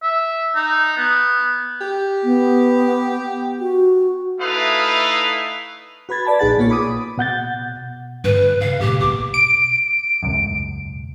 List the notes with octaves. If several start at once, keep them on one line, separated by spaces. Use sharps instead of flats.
E5
D#4
B3
G4
B3
F#4
A3 D#4 E4 B4 F5 D#6
F#4 B4 B5 G#6 A6
B4 D5 A5 B5
A#1 D#4 G#4 F#5 A6
B1 A#2 A#3 F4 C#5
G#4 B5 D6 D#6
B2 F#5 G6 A6
G2 D3 B4
C#3 F5
A#2 G#3 G4
A#1 B2 D6
D7
E1 C#2 F#2